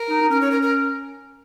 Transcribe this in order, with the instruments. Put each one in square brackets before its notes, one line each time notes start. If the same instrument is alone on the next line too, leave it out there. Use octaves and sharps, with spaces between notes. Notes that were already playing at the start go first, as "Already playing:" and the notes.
Already playing: [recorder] A#4
[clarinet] D#4
D#4
[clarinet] C#4 [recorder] A#4
[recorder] C#5
A#4
A#4